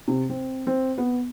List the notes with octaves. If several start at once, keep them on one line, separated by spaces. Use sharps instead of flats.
C3
C4
C4
B3